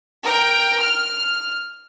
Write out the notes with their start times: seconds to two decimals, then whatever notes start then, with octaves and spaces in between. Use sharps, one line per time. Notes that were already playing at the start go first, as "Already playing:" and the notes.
0.23 A#4 G5
0.80 F6